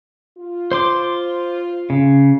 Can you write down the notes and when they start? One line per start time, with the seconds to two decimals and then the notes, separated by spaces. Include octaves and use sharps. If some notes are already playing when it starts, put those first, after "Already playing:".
0.38 F4
0.72 C5 C6 D6
1.90 C#3